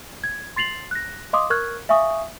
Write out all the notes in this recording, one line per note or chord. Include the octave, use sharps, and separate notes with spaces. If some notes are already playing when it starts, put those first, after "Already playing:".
G#6
C6 A6 C7 F7 F#7
F#6 A#6
D#5 F5 C6 D6 D#6
A#4 C#6 F6 F#6 G#6
E5 F5 G#5 C#6 D#6